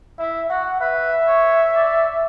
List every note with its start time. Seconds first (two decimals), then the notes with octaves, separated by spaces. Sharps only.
0.19 E4 E5
0.50 F#4 F#5
0.81 B4 E5
1.28 C#5
1.75 D5